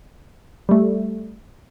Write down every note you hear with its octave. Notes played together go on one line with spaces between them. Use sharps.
G3 A3